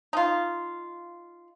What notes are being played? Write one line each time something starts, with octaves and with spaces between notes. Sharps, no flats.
D#4 F4